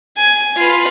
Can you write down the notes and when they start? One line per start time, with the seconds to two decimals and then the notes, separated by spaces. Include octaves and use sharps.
0.17 G#5
0.56 F4 B4